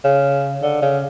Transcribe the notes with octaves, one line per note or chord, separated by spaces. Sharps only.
C#3
D3
C#3